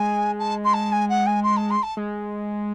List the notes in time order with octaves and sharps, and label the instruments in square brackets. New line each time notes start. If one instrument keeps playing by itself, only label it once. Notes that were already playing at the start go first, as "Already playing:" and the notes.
Already playing: [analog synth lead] G#3 [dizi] G#5
[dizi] A5
C6
A5
G#5
F#5
G#5
C6
A5
C6
A5
[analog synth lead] G#3